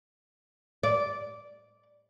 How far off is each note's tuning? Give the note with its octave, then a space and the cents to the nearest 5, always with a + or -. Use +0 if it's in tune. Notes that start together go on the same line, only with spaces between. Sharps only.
D5 -10